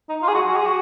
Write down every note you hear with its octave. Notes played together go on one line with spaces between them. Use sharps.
D#4
F4
G#4
F#4
F#4
G#4
F#4